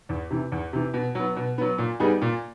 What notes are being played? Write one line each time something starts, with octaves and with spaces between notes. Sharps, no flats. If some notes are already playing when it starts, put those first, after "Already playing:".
E2
C3 E3
E2
C3 E3
B2
F#3 B3
B2
F#3 B3
A#2
G3 B3 D#4 G#4
A#2